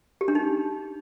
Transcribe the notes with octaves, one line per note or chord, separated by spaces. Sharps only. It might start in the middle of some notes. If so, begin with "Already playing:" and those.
G4
D4
D#4